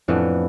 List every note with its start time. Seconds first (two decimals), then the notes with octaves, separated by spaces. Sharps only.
0.08 F2 A2 E3 B3 D4